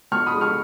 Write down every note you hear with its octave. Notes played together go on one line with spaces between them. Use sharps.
B2 C#6 F6
B5 D#6
G#3
C#6 F6